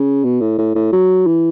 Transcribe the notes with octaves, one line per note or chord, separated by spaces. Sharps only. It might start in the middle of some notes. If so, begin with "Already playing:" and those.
Already playing: C#3
B2
A2
A2
A2
F#3
E3